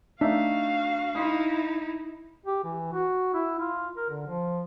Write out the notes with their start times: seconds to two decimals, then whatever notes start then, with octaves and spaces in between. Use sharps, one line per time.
0.21 A3 D4 D#4 F#4 E5 F5
1.15 D#4 E4 C6 D#6
2.46 G4
2.64 E3
2.93 F#4
3.34 E4
3.59 F4
3.97 A#4
4.10 D3
4.27 F3